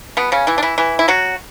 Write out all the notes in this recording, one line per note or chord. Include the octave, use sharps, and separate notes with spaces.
B2 B3
C#3 C#4
E3 E4
D4
E3 E4
E3 E4
E4
F#3 F#4